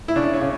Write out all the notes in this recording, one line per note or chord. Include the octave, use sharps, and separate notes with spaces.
E4
C#3 D4
C#4
C#3